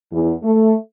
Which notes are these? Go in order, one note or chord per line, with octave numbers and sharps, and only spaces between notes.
E2
A3